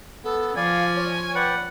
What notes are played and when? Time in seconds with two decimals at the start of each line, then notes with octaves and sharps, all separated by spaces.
0.24 B3 A4
0.56 F3 D5 F5 G#5
0.96 C#5
1.35 B4 D5 F#5 G5